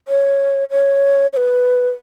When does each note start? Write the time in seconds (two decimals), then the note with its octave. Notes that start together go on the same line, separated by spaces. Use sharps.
0.08 C#5
0.71 C#5
1.33 C#5
1.37 B4